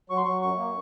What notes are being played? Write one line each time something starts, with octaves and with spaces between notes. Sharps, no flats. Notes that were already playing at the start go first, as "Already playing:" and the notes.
F#3 C#6
C6
F#3 C#6
F#2 C#6
A#3